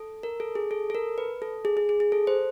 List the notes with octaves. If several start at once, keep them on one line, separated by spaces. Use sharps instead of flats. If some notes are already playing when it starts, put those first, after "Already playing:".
Already playing: A4
A#4
A4
G#4
A4
A4
A#4
B4
A4
G#4
G#4
G#4
G#4
A4
C5